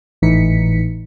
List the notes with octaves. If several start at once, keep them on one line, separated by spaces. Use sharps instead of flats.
G#1 A2 E3 D#4 B6 C#7